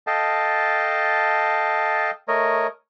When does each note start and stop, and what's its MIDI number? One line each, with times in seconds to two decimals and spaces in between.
0.07 2.11 69
0.07 2.11 75
0.07 2.11 77
0.07 2.11 79
0.07 2.11 81
2.28 2.67 57
2.28 2.67 70
2.28 2.67 73
2.28 2.67 75